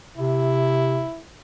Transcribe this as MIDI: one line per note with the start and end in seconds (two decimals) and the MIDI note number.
0.17 1.04 48
0.17 1.21 64